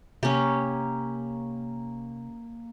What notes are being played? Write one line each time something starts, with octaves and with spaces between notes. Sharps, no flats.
C3 A#3 C#4 G4